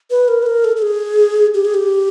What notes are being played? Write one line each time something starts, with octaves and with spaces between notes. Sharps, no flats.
B4
A#4
B4
A#4
A4
A4
G#4
G4
G#4
G4